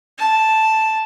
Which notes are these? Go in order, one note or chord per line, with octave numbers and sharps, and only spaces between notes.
A5